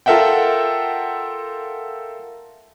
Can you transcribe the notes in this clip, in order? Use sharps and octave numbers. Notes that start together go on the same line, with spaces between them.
F4 A4 A#4 E5 F#5 G5